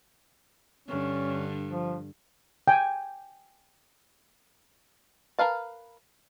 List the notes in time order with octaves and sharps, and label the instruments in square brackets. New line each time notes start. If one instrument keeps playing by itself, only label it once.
[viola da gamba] G2 D3 [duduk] C#4
[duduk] F3
[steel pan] G5 G#5
[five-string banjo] A#4 B4 F5 A5